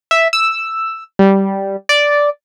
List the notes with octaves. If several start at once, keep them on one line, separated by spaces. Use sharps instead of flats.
E5
E6
G3
D5